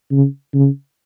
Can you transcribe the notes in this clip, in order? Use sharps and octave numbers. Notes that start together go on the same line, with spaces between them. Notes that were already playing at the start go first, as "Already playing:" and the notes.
C#3
C#3